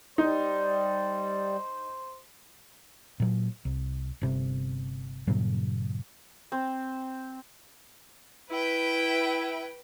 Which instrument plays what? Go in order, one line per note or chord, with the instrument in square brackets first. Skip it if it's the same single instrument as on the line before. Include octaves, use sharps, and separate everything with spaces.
[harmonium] G3 [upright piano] D#4 [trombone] C5
[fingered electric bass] A#2 F#3
C2
G1 C3
G2 A#2 C#3 F#3
[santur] C4
[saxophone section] E4 [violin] B4 G5